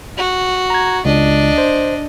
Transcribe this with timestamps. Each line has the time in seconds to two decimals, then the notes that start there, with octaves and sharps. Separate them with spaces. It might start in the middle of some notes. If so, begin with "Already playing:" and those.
0.18 F#4
0.70 A#5 G#6
1.05 C#2 D4 D#5
1.58 C5